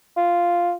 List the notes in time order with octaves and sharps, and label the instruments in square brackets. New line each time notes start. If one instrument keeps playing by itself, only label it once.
[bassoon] F4